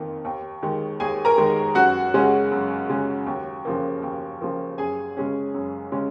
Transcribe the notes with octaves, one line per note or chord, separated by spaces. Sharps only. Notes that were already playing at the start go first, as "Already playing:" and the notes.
Already playing: F2 D#3 A#3
D#2
D#3 G#3
D#2 G#4 G#5
A#4 A#5
D#3 G#3
F#2 F#4 F#5
C#3 G#3 C#4
F#2
C#3 G#3 C#4
D#2
C#3 F3 A#3
D#2
C#3 F3 A#3
F#2 G#4 G#5
C#3 G#3 C#4
F#2
C#3 G#3 C#4